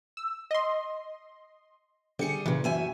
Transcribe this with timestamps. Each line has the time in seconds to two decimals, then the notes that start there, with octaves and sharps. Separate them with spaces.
0.17 E6
0.51 D#5 C6
2.19 D3 G3 G#4 C#7
2.46 A#2 C#3 E3
2.64 F#2 E5 G#5